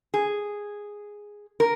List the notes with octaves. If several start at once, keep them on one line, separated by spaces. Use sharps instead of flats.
G#4
A#4